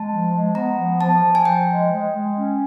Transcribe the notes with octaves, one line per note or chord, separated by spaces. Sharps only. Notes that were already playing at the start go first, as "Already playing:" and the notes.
Already playing: G#3 A5
F3
G#3
B3 A#5
F3
F3 A5
F3
G#5
F3 G5
G#3
G#3
G#3
C#4